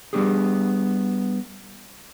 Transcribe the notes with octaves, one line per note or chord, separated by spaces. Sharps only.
G3 B3 D4 G4 G#4